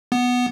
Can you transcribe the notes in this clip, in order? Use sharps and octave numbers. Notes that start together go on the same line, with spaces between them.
B3